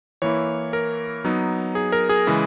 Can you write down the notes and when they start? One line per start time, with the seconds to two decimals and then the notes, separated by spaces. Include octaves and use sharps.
0.22 E3 A#3 E4 C#5
0.73 A#4
1.24 F#3 B3 D#4
1.75 G#4
1.92 A#4
2.09 G#4
2.27 C#3 E3 G#3